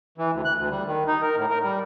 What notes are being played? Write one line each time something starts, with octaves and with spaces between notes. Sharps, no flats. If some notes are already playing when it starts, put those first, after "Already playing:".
E3
D2
F#6
D2
G3
D#3
D#4
A#4
A2
A#4
G3